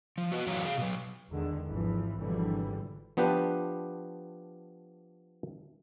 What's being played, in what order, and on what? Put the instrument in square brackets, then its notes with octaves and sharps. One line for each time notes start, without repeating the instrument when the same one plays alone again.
[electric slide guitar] F3
F#4 B4 D#5
F#2 E3 F#3 C#5 F5 A#5
G#4 F5
B2 F#3
[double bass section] E2 D3 D#3 G#3
G#1 E3 F3
G#1 B2 D3 E3 F3 G3
[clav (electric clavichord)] F3 B3 D4 G4 B4